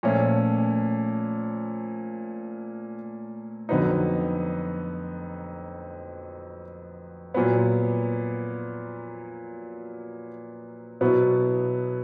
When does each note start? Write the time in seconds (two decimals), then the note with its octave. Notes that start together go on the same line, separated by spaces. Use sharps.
0.03 A#2 F3 A3 C#4
3.69 F2 D3 F#3 B3 D#4
7.34 A#2 F#3 B3
11.01 B2 F#3 B3 E4